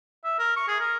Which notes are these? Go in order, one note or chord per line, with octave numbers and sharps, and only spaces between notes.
E5
A#4
C#6
G#4
A#4